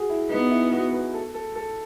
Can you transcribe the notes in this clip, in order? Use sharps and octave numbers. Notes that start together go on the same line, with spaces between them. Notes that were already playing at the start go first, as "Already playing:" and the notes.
Already playing: F#4 G#4
E4
B3 D#4
E4
F#4
B4
A4
A4
A4